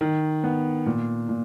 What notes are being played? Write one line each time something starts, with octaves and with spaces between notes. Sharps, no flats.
D#3
B3
A#2
A#2